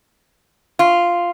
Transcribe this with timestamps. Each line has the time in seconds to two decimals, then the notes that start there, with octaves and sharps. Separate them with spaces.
0.79 F4